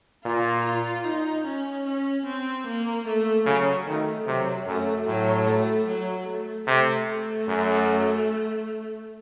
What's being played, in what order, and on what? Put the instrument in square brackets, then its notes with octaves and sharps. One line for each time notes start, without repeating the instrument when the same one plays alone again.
[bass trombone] A#2 [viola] F4
[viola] F4
D#4
C#4
C#4
C4
A#3
A3
[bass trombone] C#3 [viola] F#3
[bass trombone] D#3 [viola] A3
[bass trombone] C3 [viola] F#3
[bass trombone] F#2 [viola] A3
[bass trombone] A2 [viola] F#3
[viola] A3
F#3
A3
[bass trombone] C3 [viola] A3
[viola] A3
[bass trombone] F#2